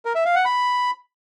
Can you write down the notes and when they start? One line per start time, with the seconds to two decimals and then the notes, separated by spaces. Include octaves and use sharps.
0.05 A#4
0.15 E5
0.25 F5
0.35 F#5
0.45 B5